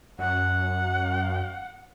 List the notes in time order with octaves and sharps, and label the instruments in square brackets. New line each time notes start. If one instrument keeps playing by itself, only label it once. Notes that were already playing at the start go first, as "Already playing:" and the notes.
[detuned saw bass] F#2 [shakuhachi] F#5